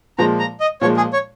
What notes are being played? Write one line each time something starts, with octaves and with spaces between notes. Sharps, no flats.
A#2 F3 G#3 A#5
A#5
D#5
A#2 F3 G#3 C#5
G#4
C#5